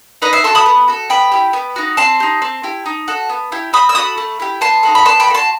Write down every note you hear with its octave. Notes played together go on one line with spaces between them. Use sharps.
D#4 B4 D#5
C5 E5
F#4 A4 A5 C6
B5 D#6
B3
F#4 A4
B3 G5 B5
E4 G4
B3
D#4 F#4
C4 A5 C6
D#4 G4
C4
E4 G4
D#4
F#4 A4
B3
E4 G4
C4 B5 D#6
E6
F#4 A4 B5 D#6
A3
E4 G4
B3 A5 C6
D#4 F#4 A4
B5
B3 A5 C6
G5 B5
F#4 A4
A5 C6